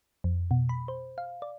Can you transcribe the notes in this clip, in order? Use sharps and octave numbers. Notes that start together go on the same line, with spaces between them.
F2
B2
B5
C5
F5
D5